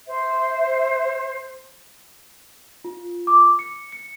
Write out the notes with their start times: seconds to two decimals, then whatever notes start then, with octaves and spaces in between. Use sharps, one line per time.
0.08 C5 E5
2.84 F4
3.27 D6
3.59 C#7
3.92 C#7